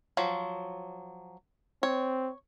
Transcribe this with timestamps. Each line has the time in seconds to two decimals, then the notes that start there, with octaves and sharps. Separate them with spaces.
0.17 F3 F#3
1.83 C4 C#5